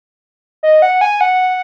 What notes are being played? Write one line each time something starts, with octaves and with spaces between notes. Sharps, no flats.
D#5
F#5
G#5
F#5